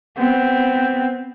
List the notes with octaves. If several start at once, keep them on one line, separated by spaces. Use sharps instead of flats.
B3 C4